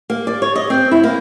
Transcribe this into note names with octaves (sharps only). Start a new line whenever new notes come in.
A#3
D5
C#5
D#5
C4
E4
A#3